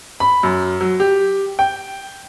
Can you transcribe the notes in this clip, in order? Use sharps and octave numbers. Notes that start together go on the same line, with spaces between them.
B5
F#2
F#3
G4
G5